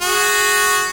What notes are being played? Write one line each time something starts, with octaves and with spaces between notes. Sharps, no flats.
F#4 G#4